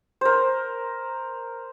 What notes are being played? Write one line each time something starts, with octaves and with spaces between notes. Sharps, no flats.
A#4 C5